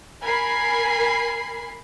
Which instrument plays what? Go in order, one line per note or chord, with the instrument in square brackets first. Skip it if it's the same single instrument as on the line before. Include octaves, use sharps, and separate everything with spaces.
[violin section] A#4 G#5 B5 C7